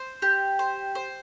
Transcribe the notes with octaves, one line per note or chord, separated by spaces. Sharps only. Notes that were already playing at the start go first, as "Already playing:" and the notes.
Already playing: C5
G4
C5
C5